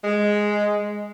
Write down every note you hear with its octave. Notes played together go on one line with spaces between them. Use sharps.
G#3